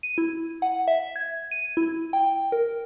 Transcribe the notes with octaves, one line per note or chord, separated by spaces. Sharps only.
D#7
E4
F#5
E5
G#6
D#7
E4
G5
A#4